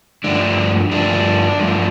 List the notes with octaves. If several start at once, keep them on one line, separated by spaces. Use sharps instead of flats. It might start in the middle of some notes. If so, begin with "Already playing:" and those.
G2 F3 A3 D4
G2 F3 A3 D4
G2 F3 A3